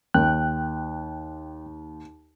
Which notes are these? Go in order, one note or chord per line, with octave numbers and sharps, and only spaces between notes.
D#2 G5 F#6